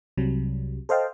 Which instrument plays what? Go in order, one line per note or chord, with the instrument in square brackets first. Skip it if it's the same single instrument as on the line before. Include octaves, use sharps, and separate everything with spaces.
[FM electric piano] C2 C3 F#3 G3
A4 C5 D#5 F5 G5 A5